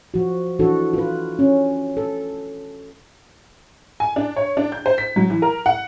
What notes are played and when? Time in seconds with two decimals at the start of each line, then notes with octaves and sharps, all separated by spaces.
0.14 F3 F#4
0.59 E3 D4 F#4 A4
0.94 F4 B4
1.39 C#4
1.97 A4
4.00 G#5
4.16 D4
4.36 C#5
4.57 D4
4.72 G6
4.86 C5
4.98 B6
5.16 F#3
5.30 E3
5.42 A#4
5.66 F#5